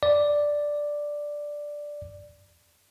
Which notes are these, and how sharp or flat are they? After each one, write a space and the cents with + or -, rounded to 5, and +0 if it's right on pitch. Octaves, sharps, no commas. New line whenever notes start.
D5 +0